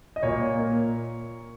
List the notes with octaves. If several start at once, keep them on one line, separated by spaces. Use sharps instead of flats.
D#5
A#2 C#5
A#3